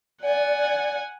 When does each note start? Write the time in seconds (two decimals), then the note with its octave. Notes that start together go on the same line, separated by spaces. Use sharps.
0.22 D5 F#5 G#5